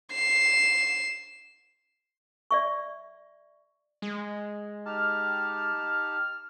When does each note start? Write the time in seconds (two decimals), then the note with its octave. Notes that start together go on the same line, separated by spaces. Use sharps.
0.12 C7 E7
2.51 D5 E5 C#6
4.02 G#3
4.86 D#4 G4 A5 F6